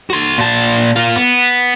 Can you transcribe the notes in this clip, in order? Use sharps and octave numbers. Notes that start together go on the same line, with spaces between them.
F#4 C6
A#2 A5
A#3 F4
B3